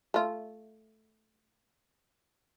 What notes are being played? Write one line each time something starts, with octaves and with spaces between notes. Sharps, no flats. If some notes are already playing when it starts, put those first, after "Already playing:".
A3 F4